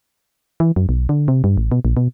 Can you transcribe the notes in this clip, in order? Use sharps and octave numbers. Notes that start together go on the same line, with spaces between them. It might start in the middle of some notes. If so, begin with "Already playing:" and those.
E3
F#2
B1
D3
C3
G2
A1
B2
A#1
B2